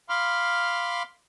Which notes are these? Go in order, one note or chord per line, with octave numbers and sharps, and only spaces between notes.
F5 B5 C6 D6 F6